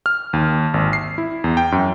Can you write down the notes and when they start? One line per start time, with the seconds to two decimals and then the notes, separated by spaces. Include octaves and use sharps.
0.06 F6
0.33 D#2
0.74 G#1
0.93 C7
1.18 E4
1.44 E2
1.57 G5
1.72 F#2